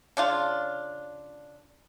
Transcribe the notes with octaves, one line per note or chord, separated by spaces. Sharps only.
C#3 D4 F4